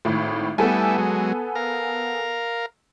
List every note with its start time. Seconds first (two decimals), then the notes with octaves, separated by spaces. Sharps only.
0.05 G#1 A2
0.58 G3 A3 B3 E4 A4 G#5
0.98 F#3 G#3
1.55 A#4 F5